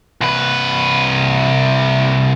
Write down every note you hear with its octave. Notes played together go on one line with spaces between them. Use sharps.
C2 B4